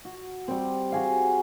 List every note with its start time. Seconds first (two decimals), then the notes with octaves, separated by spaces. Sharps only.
0.05 F#4
0.48 G3 C4
0.92 F#4 G#4 F5